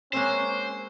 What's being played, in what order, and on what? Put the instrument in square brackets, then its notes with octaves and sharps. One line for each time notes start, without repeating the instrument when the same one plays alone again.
[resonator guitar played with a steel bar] G#3 A#3 C4 [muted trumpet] C#4 [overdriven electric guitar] C5